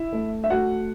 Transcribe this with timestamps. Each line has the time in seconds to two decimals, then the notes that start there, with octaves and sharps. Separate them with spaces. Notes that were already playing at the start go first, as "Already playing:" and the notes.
Already playing: E4 E5
0.12 A3
0.44 E5
0.50 A3 F#4 F#5